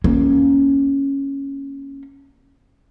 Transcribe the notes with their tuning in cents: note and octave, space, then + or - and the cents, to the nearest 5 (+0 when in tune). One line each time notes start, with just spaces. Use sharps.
A#3 +0 C#4 -5